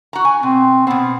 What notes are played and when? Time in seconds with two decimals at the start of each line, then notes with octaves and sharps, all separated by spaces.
0.13 F#4 A#5
0.25 G#5
0.43 B2 C4
0.87 B2 B3 C4